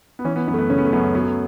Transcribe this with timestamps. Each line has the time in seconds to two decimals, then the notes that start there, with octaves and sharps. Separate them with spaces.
0.19 B3
0.24 E3 C#4
0.36 B3
0.48 F#2 B3
0.54 A3
0.58 B3
0.70 C#3 C#4
0.78 B3
0.85 A3
0.93 F#2 B3
1.15 F#3 B3
1.23 A3